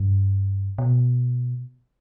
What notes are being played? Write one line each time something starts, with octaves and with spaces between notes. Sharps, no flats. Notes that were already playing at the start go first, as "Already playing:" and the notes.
Already playing: G2
B2